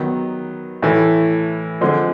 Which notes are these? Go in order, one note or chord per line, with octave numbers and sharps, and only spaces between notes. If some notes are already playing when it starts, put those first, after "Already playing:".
Already playing: D#3 F#3 B3
A2 E3 A3
D3 F3 G#3 C4